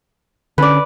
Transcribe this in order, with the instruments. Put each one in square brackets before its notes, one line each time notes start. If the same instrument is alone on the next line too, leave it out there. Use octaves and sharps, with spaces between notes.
[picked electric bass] D3 C#4 [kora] B4 D5